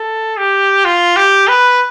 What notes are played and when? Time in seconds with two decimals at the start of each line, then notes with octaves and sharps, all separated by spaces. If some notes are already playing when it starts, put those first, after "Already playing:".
Already playing: A4
0.38 G4
0.85 F4
1.16 G4
1.48 B4